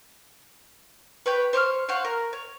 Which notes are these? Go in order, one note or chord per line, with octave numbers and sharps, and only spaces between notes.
B4 C#5 G5
C5 C#5 D6 F6
C5 C#5 F5 F#5
A#4
C#5